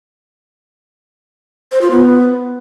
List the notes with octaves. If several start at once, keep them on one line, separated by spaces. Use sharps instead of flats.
C5
F4
B3